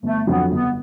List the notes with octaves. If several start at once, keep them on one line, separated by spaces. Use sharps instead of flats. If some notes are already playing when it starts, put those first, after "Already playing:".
G1 A3
F2 D3 F#3 B3
G1 B3